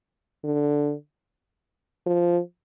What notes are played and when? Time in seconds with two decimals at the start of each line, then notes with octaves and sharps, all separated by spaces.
0.44 D3
2.07 F3